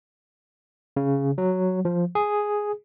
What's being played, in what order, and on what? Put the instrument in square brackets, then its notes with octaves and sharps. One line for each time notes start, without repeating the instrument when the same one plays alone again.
[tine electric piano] C#3
F#3
F3
G#4